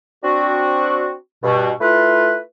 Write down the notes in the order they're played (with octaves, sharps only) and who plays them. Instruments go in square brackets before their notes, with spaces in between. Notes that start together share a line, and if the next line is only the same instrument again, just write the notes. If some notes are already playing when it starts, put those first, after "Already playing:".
[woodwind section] C4 D4 F#4
G2 B2
A3 E4 F4 B4